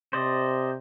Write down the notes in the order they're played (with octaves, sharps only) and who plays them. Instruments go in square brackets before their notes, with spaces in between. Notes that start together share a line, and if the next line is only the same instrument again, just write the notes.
[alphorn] C3 [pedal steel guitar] C5 D5 D#5